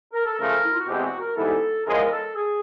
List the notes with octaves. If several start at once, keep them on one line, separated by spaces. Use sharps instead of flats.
A#4
A4
C#3 F3 A3 A#4
E4
F4
F#4
E2 B2 G#3 C4 G4
F#4
A#4
G#2 E3 G3 B3 E4 A4
E2 C#3 F3 G#3 A#4
A4
G#4